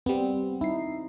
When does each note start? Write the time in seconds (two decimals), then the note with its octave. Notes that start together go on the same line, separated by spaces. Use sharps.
0.06 G3 B3 C4
0.61 D#4 E4 C7